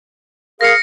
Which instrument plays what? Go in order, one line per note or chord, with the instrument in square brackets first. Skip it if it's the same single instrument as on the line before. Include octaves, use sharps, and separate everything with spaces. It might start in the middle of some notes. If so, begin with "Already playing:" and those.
[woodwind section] G#4 A#4 F5 [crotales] A#6 C#7